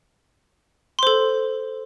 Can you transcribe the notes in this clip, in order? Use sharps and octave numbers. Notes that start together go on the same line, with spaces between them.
A4 C5 C6